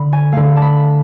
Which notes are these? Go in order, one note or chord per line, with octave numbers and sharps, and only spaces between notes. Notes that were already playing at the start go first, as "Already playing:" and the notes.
Already playing: D3 B5
G#5
D3 A3 F5
A5
B5